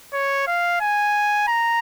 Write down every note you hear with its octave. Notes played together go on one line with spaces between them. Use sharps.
C#5
F5
G#5
A#5